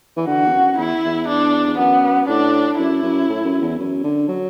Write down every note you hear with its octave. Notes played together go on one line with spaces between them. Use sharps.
E3
D3 F#4
E2
F#2
E2 E4
E2
D4
E2
F#2 B3
A2 D4
F#2 E4
F#2
A2
F#2
E2
F#2
D3
F#3